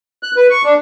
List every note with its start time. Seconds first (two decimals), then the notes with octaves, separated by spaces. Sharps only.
0.23 F#6
0.36 B4
0.50 C#6
0.64 D4